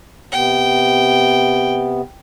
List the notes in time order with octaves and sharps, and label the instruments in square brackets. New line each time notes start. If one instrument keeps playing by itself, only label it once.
[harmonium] C3 B3 [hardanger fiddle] G5